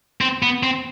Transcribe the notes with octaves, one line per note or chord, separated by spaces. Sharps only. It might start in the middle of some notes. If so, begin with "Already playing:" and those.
C4
B3
C4